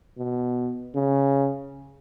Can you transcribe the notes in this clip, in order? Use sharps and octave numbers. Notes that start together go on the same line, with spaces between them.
B2
C#3